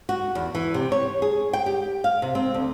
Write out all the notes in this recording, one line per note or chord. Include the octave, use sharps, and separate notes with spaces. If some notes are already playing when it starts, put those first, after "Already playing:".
F#4
E2
E3
C3
C#5
G#4
G5
G4
F5
C3
C4
D2